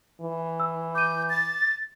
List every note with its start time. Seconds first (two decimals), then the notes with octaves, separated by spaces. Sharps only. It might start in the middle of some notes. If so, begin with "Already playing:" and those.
0.21 E3
0.60 E6
0.95 D6 G6 D#7
1.29 A6